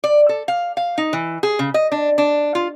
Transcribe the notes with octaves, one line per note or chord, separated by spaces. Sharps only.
D5
A4
F5
F5
D#4
E3
G#4
C#3
D#5
D4
D4
F4